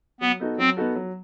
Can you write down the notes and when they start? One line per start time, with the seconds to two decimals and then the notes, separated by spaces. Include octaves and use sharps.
0.20 F#3 B3
0.40 B3 D#4 F#4 A4
0.58 F#3 C4
0.77 B3 D#4 F#4 A4
0.95 F#3